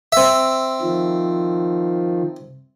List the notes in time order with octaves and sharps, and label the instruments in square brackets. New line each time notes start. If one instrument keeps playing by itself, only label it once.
[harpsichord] C4 E5
[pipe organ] D#3 F3